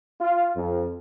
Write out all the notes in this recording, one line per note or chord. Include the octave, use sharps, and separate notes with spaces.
F4
F2